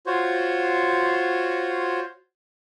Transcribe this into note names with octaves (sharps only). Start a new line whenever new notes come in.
F4 F#4 C5 C#5